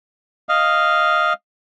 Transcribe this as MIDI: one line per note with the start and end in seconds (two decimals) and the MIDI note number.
0.49 1.33 75
0.49 1.33 77